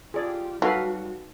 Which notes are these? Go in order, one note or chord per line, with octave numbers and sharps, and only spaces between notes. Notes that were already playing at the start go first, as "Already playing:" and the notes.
F4 G4 G#4 D5
F#3 G3 D#4 F#4 A4 B4 F5 G5